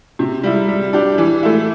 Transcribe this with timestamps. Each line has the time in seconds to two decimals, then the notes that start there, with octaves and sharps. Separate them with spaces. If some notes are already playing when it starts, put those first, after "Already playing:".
0.19 C3
0.43 G3 E4
0.68 G3
0.93 D4 G4
1.18 E3
1.43 A3 E4